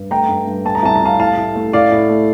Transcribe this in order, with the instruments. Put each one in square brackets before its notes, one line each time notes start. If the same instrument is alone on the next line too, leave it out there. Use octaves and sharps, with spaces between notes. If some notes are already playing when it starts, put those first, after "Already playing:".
Already playing: [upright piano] G2
A3 G5 A#5
G2
G2
A3 A5
A#5
C2 A5
A#5
C2 F5 A5
A2 F5 A5
A2
A3
A2 D5 F5
A2
A3